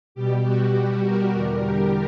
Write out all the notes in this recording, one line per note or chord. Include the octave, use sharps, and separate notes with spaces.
B2 G3 G4
F#4
G4
A#4
E2 D3 G3
G4